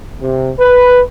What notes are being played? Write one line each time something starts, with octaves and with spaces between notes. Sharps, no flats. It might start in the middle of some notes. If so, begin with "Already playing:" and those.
C3
B4